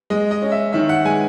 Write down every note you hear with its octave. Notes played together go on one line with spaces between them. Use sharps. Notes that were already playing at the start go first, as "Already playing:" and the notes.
G#3 D#5
D#5
C#4
E5
D#3 E5
F#5
G#3 G#5